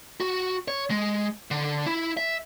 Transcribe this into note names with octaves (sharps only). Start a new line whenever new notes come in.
F#4
C#5
G#3
D3
E4
E5